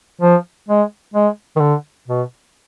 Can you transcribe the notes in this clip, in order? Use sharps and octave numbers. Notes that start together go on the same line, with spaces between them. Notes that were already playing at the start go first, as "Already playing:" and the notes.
F3
G#3
G#3
D#3
D3
B2